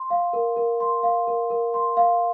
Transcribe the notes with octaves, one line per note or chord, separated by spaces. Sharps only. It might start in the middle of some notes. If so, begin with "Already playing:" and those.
Already playing: C6
F5
A#4
A#4
C6
F5
A#4
A#4
C6
F5